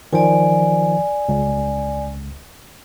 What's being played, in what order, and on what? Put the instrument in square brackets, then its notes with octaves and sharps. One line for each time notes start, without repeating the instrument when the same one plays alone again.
[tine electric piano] D#3 F3 [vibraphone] D5 G#5
[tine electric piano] C#2